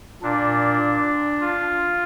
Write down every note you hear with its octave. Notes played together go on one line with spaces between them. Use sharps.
A#2 D4
F4